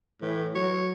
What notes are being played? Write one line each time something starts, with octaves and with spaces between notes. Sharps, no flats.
A2 E3
F#3 C#5